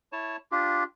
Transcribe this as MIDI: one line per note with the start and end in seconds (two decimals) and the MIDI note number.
0.12 0.36 64
0.12 0.36 73
0.12 0.36 81
0.52 0.84 62
0.52 0.84 65
0.52 0.84 67